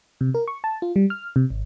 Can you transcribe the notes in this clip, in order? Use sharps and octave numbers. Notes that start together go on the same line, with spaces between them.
C3
A#4
C#6
A5
F4
G3
F6
C3
G#1